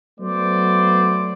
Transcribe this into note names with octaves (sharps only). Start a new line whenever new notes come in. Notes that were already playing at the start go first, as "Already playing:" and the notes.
F#3 A3 B3 C5 D5